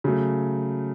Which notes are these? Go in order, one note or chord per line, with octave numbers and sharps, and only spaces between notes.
C#3 F#3 A3